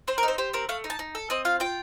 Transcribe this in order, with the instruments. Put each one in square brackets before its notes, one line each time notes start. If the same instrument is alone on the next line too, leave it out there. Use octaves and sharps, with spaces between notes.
[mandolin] C4 C5
A#4
D#4
C5
G4 C5
C4 A#4
A3 F5
D#4
A5
D#4
A4
C4 D#5
F4 F5
F4 G5